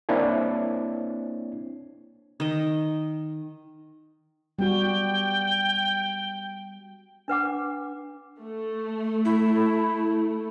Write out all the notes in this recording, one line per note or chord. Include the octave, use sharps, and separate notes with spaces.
A#3 C4 D4 E4 C#5
D#3 D#5
G3 B3 F#4 G5
D4 B4 F#5 D6
A3
E4